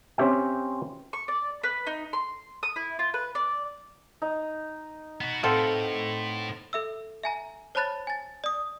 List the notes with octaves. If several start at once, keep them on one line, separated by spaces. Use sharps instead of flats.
C4 C#4 G4 E5 G5
C#6
D5
B4
D#4
C6
D#6
E4
F4
B4
D5
D#4
B3 F#4
A2 C4 F4 A4 B4 C5 F#5
A4 E5 E6
E5 G#5 A#5
C5 C#5 A5 B5 F#6 A6
G#5 A6
D5 D#6